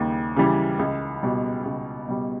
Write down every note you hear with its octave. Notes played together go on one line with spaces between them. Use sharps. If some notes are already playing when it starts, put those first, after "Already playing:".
Already playing: D#2 C#3 G3
C#3 E3 G3
C#2
B2 G3
C#2
B2 G3